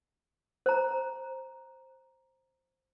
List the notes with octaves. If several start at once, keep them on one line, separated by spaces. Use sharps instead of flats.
C5 A#5